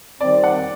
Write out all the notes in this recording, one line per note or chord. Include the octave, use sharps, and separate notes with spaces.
D#3 G3 C4 D5
F#5